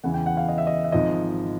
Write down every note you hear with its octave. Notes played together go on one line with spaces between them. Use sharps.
E2 C#3 E3 F#5
G5
F#5
F5
D#5
E5
D#5
E5
G#1 G#2 F3 D#5